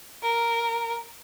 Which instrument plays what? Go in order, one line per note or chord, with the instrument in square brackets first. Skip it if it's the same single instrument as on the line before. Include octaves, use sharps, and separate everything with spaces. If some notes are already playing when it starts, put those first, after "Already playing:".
[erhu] A#4